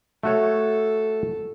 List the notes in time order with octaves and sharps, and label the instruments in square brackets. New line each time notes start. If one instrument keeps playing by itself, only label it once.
[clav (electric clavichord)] A3 F#4 C#5 [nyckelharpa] A4